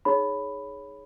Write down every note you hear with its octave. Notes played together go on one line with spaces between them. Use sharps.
D#4 G#4 C#5 B5